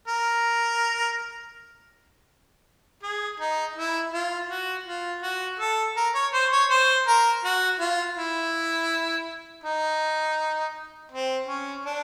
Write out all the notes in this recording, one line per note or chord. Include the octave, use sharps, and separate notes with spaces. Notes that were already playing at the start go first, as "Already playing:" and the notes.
A#4
G#4
D#4
E4
F4
F#4
F4
F#4
A4
A#4
C#5
C5
C#5
C5
A#4
F#4
F4
E4
D#4
C4
C#4
D4